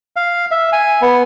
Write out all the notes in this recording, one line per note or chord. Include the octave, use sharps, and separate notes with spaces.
F5
E5
G#5
B3